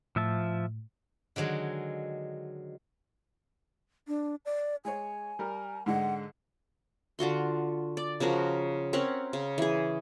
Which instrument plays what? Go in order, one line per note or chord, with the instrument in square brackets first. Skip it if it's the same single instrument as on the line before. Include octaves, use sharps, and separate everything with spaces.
[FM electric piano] A2 [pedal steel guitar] F3 E5 A5
[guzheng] D3 D#3 F#3 G#3
[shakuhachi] D4
D5
[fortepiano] G#3 C#5 [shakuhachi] G#5
[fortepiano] G3 A#4
[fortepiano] G#2 D3 G#3 [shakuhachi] F#5
[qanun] D3 F4 F#4 C6
D5
C#3 F3 F#4 A#4
C4 C#4 A#4 F#5
C#3
E3 G#4